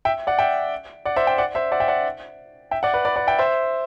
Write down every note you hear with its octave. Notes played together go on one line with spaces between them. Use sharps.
E5 G5
D5 F#5
E5 G5
D5 F#5
C5 E5
E5 G5
D5 F#5
C5 E5
D5 F#5
E5 G5
D5 F#5
E5 G5
D5 F#5
B4 D5
B4 D5
D5 F#5
E5 G5
C5 E5